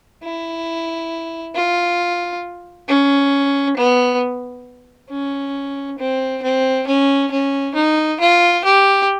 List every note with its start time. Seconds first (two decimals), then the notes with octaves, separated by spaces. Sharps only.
0.23 E4
1.55 F4
2.88 C#4
3.77 B3
5.10 C#4
5.98 C4
6.42 C4
6.87 C#4
7.31 C#4
7.75 D#4
8.20 F4
8.64 G4